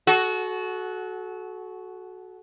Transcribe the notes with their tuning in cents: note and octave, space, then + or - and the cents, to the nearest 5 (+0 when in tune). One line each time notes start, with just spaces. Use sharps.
F#4 +0 A4 -35